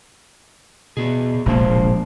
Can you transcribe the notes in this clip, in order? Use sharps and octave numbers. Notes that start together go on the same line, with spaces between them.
B2 B3 G#4
D1 A#1 C3 F3 G#3 A#3